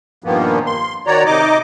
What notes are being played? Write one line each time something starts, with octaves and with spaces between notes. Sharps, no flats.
G2 A#2 D#3 F3 A#3 B3
C6
D#3 F#4 C#5 D5 A#5
C3 D#4 D#5 D6